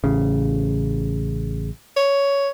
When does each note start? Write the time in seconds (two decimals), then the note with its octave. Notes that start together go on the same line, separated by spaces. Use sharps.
0.04 A1 C#3
1.97 C#5